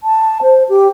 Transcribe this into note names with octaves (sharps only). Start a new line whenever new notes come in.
A5
C5
G4